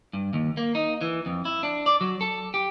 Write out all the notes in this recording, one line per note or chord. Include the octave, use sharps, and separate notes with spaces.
G2
D#2
A#3
D#4
E3
F2
E4
D4
D5
F#3
A4
G4